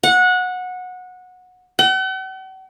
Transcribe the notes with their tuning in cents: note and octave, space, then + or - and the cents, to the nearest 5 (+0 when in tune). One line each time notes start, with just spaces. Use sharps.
F#5 -20
F#5 +45